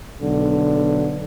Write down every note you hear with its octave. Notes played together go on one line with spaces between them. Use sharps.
B1 D3